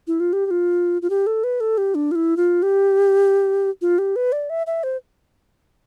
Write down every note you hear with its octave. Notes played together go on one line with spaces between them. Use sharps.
E4
F4
G4
G4
F4
F4
G4
A4
B4
A4
G4
D4
F4
E4
F4
G4
F4
G4
B4
D5
E5
E5
C5